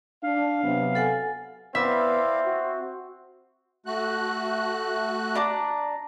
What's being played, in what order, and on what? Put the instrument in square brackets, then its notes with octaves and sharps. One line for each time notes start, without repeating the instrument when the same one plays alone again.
[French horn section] D4 [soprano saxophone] F5
[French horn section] C3 F#3 B3
[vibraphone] A4 F#5 G#5
[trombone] B3 [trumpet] C4 [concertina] E4 D5 F5 [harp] E5
[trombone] F#4
[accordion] A3 F#4 F#6
[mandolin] D4 D5 A#5